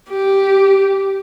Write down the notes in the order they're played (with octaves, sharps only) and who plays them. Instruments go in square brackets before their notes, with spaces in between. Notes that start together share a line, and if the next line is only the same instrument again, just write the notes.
[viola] G4